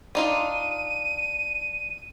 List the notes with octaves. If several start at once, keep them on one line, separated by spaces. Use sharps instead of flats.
D4 D#4 F4 D#7